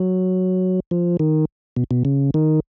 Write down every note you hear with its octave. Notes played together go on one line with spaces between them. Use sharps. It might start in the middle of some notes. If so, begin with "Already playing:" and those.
Already playing: F#3
F3
D#3
B2
B2
C#3
D#3